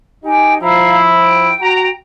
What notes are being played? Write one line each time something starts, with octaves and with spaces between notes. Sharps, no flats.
D#4 G4 G5 G#5
F3 E4 F5 A#5
G5
F#4 A#5